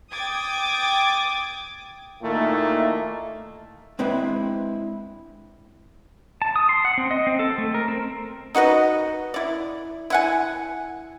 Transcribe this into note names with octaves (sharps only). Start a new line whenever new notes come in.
G5 D6 D#6 G#6 A6
A#2 D#3 A3 A#3 E4
G#3 C4 D4 E4 B4 E5
A5
D#6
C6
F#5
C4
D#5
C4
A4
A3
A#4
C4
D#4 F#4 B4 D#5
E4 D5
E4 F#5 G#5